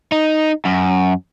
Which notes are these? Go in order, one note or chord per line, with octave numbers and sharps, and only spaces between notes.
D#4
F#2